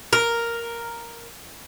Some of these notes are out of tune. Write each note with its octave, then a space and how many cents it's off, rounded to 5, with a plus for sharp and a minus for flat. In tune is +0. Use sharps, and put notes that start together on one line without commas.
A#4 +0